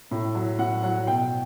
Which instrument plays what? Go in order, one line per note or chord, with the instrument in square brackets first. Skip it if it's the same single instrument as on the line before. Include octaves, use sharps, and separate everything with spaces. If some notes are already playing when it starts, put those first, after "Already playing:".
[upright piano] A2
F#3
A2 F#5
F#3 F#5
B2 G5